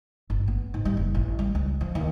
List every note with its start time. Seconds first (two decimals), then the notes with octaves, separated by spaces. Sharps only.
0.30 G1
0.48 B3
0.74 G#2
0.85 G3
0.97 F#1
1.15 A1
1.39 G3
1.55 C#2
1.81 F3
1.95 D#2